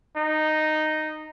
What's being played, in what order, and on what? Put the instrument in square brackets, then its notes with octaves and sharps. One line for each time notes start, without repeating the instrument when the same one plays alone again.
[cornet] D#4